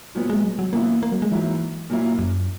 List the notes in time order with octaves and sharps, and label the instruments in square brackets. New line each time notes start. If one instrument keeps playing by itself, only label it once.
[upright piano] A#2 F#3 B3
[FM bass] G#3
F#3
F#3
[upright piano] F#2 E3 B3 E4 [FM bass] A#3
[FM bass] A#3
F#3
G#3
[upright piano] G#2 F#3 A#3 E4 [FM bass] E3
[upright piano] A#2 F#3 A#3 E4
[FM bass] F#2